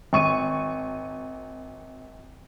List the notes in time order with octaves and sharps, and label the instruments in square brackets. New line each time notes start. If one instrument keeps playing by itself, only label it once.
[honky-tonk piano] G#1 C#6 D#7